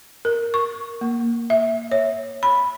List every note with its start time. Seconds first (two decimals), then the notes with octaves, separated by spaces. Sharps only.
0.25 A#4
0.54 C#6
1.01 A#3
1.50 E5
1.92 C#5
2.43 B5